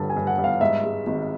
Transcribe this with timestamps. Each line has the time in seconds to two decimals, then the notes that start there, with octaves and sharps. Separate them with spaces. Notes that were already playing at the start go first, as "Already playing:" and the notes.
Already playing: G2 D3 A5
0.10 G#5
0.16 G2
0.27 F#5
0.38 G2
0.44 F5
0.61 G#2 E5
0.83 G#3
1.07 G#1